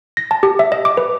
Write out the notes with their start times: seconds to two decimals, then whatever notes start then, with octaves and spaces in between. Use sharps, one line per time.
0.17 A#6
0.31 A5
0.43 G4
0.59 E5
0.72 D#5
0.85 D6
0.97 B4